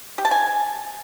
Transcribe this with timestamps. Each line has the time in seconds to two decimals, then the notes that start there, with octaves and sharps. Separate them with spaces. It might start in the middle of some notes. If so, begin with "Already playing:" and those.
0.18 G4
0.25 A5
0.31 G#5